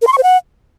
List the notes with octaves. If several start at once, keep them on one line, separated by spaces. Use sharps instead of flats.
A#4
C6
C#6
C5
F#5